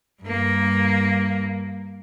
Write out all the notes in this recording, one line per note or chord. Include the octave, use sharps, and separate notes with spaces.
G2 A#3